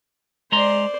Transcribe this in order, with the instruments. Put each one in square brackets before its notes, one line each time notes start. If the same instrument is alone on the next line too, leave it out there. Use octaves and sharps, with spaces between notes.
[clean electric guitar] G#3 A#5 C6 [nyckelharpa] C5 D5